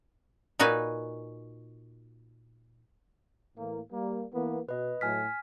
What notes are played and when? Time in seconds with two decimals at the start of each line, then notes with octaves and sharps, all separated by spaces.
0.59 A#2 D#4 F#4 B4 G#5
3.57 A2 E3 A#3
3.91 G3 A#3
4.33 E3 A#3 B3
4.69 B2 B4 D#5
5.01 A2 F#3 G#5 F6 B6